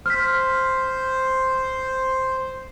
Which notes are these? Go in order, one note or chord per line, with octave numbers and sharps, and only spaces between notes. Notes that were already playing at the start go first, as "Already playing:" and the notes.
C5 F6 B6